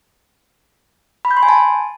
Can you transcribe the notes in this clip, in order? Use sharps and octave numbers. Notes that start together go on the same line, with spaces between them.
B5
G6
C6
G#5
A5